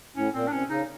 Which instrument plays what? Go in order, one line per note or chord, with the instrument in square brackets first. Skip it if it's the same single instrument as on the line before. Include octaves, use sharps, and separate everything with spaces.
[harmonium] A2 [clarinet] C#4
[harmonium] A#2 [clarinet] C4
[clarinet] D4
[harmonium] C3 [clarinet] C#4
[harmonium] C#3 [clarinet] D#4